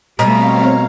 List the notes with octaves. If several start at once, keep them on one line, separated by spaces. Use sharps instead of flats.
B2 G3 A3 C4 C#5 F5 A#5